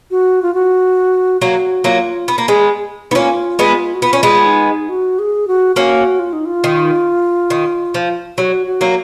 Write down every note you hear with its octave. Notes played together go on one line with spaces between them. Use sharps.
F#4
F4
F#4
F#3 A#3 F#4
F#3 A#3 F4
B3
A#3
G#3 B3
B3 D#4
A#3 C#4 F4
G#3 B3
F#4
B3 F4
C#4
G#3 B3
D#4
F#4
G#4
F#4
A#3 C#4 F#4
F4
D#4
F4
D#3
D#3
F3
F#3 F#4
F#4
F#3 A#3